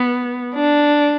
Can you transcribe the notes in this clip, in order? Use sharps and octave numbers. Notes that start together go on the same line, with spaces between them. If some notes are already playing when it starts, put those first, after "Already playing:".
Already playing: B3
D4